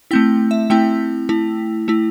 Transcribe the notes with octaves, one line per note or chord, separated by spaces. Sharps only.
A3 C4 E4 G5
E5
A3 C4 E4 G5
A3 E4
A3 E4